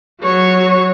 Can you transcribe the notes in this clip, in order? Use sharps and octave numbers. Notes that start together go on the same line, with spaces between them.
F#3 C#5